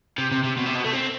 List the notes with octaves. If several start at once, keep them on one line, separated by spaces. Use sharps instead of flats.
C3
C3
C3
B2
C3
B2
A3
C4